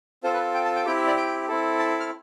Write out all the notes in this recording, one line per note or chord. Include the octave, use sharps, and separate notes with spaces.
C4 F4 A4 C5
B4
G5
A5
G5
C4 E4 G4 G5
E5
D5
G5
C4 E4 A4
A5
F6